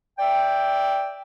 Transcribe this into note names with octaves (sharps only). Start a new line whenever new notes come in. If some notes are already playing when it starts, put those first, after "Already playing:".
D5 E5 G5